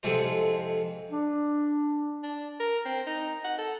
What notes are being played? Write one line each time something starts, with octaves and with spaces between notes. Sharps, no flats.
A1 F2 C3 G#3 F4 C5
D4
D4
A#4
C4
D#4
F#5
A4